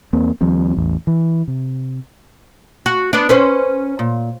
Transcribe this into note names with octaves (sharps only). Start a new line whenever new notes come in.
E2 A#3 C4
D#2 F3 G3 C4
A1 E2
E3
C3
F#4
B3 D4
C#4 B4 C5
A#2